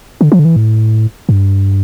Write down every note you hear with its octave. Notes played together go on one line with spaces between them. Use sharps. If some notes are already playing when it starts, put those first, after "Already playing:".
D3
F3
D3
E3
A2
G2